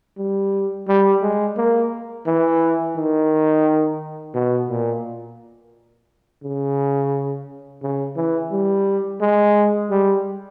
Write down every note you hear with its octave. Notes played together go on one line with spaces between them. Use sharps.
G3
G3
G#3
A#3
E3
D#3
B2
A#2
C#3
C#3
E3
G3
G#3
G3